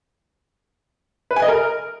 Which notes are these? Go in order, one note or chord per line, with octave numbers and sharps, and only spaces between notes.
B4
G#5
D#5
A#4